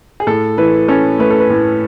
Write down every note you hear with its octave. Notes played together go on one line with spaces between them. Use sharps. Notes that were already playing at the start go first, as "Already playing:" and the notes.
G#4
A2 A4
E3 B4
C#4 A4
A3 B4
A4
B4
A2